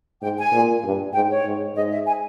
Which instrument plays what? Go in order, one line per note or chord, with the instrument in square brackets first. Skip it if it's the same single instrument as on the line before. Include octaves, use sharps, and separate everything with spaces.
[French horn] G#2 [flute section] G5
[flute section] G#5
[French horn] A#2
G2
[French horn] G#2 [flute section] G5
[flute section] C#5
[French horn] G#2
[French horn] G#2 [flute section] D#5
[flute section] E5
G#5